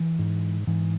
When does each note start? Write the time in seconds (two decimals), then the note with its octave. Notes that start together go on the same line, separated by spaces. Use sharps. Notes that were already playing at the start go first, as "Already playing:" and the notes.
Already playing: E3
0.19 G#2
0.67 G#2 E3